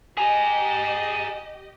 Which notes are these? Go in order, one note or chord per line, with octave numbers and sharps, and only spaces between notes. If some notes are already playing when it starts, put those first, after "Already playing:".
G4 G#4 D#5 G#5 A#5